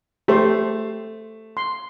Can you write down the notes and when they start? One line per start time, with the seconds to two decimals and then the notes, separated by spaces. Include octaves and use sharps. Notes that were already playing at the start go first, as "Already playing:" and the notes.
0.28 A3 G4 C5
1.57 C6